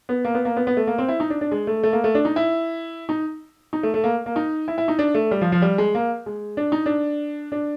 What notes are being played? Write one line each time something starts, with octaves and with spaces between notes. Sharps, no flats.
B3
A#3
B3
A#3
B3
B3
A3
A#3
C4
E4
D#4
D4
D4
G#3
A3
A3
A#3
A3
D4
D#4
E4
D#4
D#4
A3
A3
A#3
A#3
D#4
E4
E4
D#4
D4
A3
G3
F3
F3
G3
G#3
A#3
G#3
D4
D#4
D4
D4